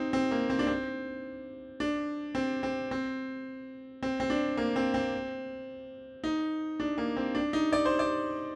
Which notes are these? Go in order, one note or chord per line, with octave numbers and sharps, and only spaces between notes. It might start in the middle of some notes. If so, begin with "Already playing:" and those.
Already playing: C4 D#4
C4
A#3
C4
D4
C4
D4
C4
C4
C4
C4
C4
D4
A#3
C4
C4
D#4
D4
A#3
C4
D4
D#4
D5
C5
D5